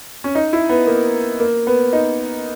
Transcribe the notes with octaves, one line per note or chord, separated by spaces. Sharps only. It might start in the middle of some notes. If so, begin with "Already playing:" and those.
C#4
D#4
E4
B3
A#3
A#3
B3
D#4